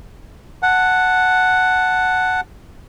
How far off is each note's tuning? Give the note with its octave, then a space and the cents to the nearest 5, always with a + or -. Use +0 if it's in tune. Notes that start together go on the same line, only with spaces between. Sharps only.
F#5 +0 A5 +0